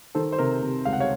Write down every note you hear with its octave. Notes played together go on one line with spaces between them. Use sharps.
D#3 A4 C5
C5
C3 A#4
C3
C#2 F5
F#5
C#5 F5